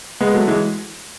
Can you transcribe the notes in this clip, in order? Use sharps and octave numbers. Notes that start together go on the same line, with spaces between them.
G#3 B3
F#3 A3
E3 G#3